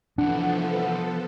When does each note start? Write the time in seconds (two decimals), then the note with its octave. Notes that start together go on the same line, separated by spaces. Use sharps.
0.18 C2 E3 F3 B3 D4 A4 F#5